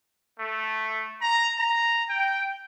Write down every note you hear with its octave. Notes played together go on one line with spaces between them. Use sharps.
A3
A#5
A#5
G5